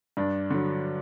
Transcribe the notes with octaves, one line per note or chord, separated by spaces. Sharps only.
G2 D4
D3 F#3